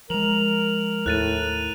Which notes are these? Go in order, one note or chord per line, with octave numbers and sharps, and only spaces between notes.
F3 G#3 A#4 F7 F#7
D#2 A2 F#6 A6 D#7